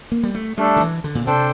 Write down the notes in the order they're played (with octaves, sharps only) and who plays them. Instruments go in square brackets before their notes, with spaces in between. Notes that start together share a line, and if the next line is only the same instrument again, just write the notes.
[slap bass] A#3
G3
A3
[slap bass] G3 [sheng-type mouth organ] A3 D4 A4
[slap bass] D3
E3
D3
A#2
[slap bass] C3 [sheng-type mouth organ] D4 A4 C5 G5